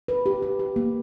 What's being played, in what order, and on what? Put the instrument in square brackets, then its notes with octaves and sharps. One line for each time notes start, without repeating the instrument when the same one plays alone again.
[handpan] B4
G4
G4
G4
A#3